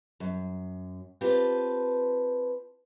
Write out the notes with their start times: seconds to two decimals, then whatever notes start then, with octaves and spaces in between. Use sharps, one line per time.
0.20 F#2
1.21 C4 F4 G4 B4 A5